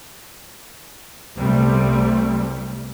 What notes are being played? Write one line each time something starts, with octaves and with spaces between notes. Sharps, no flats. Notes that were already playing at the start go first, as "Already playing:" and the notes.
C2 C3 G3 A3 B3 C4